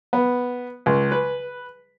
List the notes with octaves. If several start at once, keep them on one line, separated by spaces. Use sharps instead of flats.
B3
C#2
B4